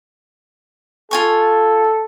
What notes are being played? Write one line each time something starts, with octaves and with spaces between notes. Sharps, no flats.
F4 A4 G#5 C#6